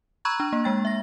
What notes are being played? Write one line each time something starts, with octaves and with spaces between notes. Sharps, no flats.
A#5 B5 C#6 E6 F#6 G#6
D4
A#3
G#3 G5 A6
E5 A#6